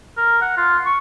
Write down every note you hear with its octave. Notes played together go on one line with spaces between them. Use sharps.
A#4
F#5
F4
C#6